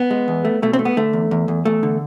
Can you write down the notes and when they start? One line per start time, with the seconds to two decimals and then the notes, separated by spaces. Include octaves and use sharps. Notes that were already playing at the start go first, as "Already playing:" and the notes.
Already playing: B3
0.10 G#3
0.28 E2
0.45 A3
0.62 B2 A3
0.73 C4
0.79 A3
0.85 B3
0.97 D3 A3
1.13 E2
1.31 E2
1.48 E2
1.65 E2 A3
1.83 D3